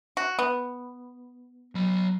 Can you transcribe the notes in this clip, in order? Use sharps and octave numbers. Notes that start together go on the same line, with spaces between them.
F#4
B3
F#3 B5